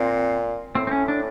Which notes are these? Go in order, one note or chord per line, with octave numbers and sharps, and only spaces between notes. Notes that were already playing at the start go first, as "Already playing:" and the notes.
Already playing: A#2 C4
A2 C4
C4
C#4
D4